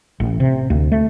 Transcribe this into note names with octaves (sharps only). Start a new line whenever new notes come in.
A1
C3
D2
A3